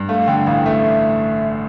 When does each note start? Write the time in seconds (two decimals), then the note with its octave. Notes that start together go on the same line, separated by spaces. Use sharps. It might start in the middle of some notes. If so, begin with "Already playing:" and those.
Already playing: G2
0.09 A3 F5
0.27 D3 G5
0.47 A1 F5
0.66 A3 E5